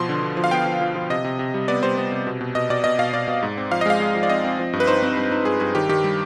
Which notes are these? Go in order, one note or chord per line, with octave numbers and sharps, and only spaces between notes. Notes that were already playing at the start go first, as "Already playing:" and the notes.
Already playing: B2 F3 C6
D3
D3
F3
F5
B3 G5
F3
F3
F3
C3 D#5
C3
C3
G3
B3 D5
G3 C5
B3
C3
B2
B2
B2 D#5
B2 D5
B2 D#5
B2 F5
B2 D5
B2
G#2
C4
F3 F5
D#5
G#3 F5
G#3
F3
D5
C4 D#5
C4
F3
G2
B4
D#4 C5
C4
G2
D#4
G2 G#4
G2 G#4
D#3 G4
D#3 G4
G3